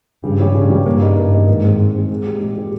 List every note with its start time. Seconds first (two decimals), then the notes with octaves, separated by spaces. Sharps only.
0.23 G2 C#3
0.40 G3 C#4 G4
0.55 G2 C#3
0.70 G3 C#4 G4
0.86 G2 A#3
1.02 D#4 A#4 D#5
1.17 G2 A#3
1.33 D#4 A#4 D#5
1.48 G#2 D#3
1.64 G#3 C4
1.78 D#3
1.95 G#3 C4
2.10 G#2 G#3
2.26 C4 G4
2.41 A#2 G#3
2.57 C4 G4